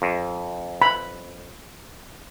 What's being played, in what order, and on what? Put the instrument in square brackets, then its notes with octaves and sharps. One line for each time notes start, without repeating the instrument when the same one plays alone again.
[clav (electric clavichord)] F2
[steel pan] B5